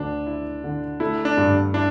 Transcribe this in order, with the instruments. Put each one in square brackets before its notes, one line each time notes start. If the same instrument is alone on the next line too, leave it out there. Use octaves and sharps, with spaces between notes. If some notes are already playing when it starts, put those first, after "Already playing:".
Already playing: [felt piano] D2 A3 [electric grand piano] D4
[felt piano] E4
D3
[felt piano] A3 [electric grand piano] E4
[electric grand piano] D4
[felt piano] G2
[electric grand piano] D4 [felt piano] E4